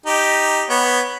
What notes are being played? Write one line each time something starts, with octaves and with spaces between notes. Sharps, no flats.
D#4 G4
B3 C#5